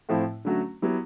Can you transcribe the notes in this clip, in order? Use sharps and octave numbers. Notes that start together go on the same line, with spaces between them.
A2 F3 A3 C4 E4
D3 F#3 A3 C#4 F#4
F#3 B3 E4 G4